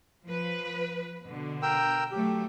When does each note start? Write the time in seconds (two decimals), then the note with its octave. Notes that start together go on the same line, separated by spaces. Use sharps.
0.25 F3 B4
1.24 B2 D3
1.62 A#4 G5 E6
2.11 F#3 A3 G4